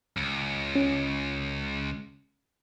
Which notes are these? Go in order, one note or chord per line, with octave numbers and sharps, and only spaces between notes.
C#2
C#4